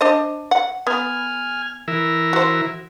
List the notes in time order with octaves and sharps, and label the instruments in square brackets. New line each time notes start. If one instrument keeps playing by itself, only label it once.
[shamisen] D4 C5 D#5
F#5
[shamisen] B3 [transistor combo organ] G#5 F6
[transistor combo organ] E3 A#4 E5
[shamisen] F#4 C5